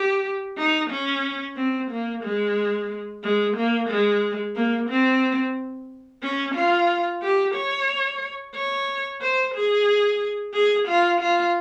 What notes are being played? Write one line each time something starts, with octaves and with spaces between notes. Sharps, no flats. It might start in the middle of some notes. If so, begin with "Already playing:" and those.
Already playing: G4
D#4
C#4
C4
A#3
G#3
G#3
A#3
G#3
A#3
C4
C#4
F4
G4
C#5
C#5
C5
G#4
G#4
F4
F4